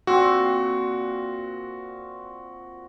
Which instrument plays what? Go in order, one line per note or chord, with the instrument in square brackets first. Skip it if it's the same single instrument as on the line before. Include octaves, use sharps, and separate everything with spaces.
[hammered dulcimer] A#2 C4 [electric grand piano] F#4